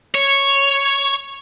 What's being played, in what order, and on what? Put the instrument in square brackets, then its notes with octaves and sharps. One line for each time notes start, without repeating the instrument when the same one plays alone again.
[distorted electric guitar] C#5